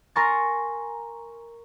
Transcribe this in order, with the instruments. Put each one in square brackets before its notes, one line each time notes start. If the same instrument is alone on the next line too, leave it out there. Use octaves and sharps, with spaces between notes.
[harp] A#4 G#5 A#5 C6 C#6 A6